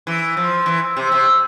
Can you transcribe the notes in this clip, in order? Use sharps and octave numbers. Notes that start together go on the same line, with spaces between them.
E3
F3
E3
C3
C3